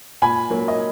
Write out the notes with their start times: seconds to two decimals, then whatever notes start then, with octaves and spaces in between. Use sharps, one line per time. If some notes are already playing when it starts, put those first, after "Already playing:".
0.22 A#2 G#5 B5
0.50 F#3 A#3
0.68 D#5